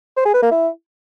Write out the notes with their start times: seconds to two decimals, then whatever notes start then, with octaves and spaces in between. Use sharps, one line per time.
0.17 C5
0.25 G#4
0.34 B4
0.42 A#3
0.51 E4